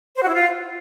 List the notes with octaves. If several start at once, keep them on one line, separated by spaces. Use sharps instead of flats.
C5
F#4
E4
F4